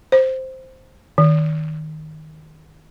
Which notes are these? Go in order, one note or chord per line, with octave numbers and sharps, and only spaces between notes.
C5
D#3